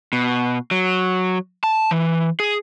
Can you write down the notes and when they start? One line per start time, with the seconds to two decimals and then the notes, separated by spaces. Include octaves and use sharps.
0.13 B2
0.71 F#3
1.64 A5
1.91 E3
2.40 G#4